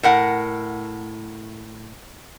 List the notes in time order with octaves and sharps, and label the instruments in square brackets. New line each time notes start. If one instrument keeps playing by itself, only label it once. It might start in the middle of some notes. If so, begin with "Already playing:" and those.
[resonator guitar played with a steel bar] A2 A#4 F#5